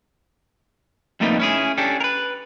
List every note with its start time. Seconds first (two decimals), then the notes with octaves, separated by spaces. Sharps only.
1.20 F2 G3 A3 A#3 D#4 B4
1.40 C#4 E4 G#4
1.78 C#4 D4 G4 A4
2.00 A#4 B4